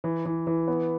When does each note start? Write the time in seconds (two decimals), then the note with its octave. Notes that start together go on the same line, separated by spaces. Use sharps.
0.04 E3
0.26 E3
0.47 E3
0.68 B3